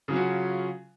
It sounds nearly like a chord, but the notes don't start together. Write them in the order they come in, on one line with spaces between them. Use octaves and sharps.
C#3 F#3 C#4 F#4 F4